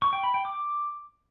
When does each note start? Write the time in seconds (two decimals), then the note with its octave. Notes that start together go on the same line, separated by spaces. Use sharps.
0.02 C#6
0.13 G5
0.23 B5
0.34 G5
0.45 D6